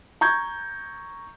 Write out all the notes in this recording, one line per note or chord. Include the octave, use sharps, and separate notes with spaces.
A#5 C#6 G6 G#6